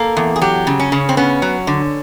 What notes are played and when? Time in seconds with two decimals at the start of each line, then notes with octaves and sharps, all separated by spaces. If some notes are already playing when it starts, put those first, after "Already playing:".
Already playing: A#3 A4
0.17 E2
0.36 G#4
0.41 F#3 G4
0.67 C#3
0.79 C#4
0.92 C#3
1.09 C4
1.17 B3 C#4
1.42 F#3
1.67 D3